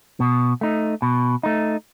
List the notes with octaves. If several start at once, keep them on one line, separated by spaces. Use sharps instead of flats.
B2
A3 D#4
B2
A3 D#4